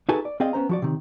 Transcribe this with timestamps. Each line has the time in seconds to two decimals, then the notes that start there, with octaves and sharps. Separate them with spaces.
0.09 D#4 F#4 G#4 A4 B4 G#5
0.25 D5
0.40 C4 G#4 D5 D#5 F5 G5
0.53 B3 C#4 C5 A#5
0.69 F3 F#4 D5
0.82 C3 D#3